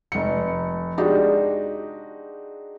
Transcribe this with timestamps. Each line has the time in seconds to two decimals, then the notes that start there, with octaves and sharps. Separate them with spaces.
0.12 F1 C#7
0.98 G#3 D4 D#4 F#4 G4